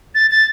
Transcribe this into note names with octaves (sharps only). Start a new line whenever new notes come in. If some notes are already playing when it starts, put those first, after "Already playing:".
A6
A6